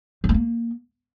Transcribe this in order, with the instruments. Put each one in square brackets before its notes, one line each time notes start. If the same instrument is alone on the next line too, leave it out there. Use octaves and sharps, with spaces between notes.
[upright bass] F3
A3
A#3